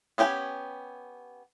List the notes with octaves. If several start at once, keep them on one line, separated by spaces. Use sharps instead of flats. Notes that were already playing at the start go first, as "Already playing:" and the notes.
B3 C#4 G4 G5 G#5